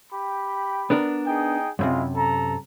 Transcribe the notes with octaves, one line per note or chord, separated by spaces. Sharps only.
G4 G5 B5
B3 D4 A#4
D#4 G#4 G5
F#2 A2 C3 G#3 E4 F4
A4 A#5